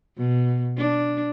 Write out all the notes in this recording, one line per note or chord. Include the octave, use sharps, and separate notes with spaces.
B2
D4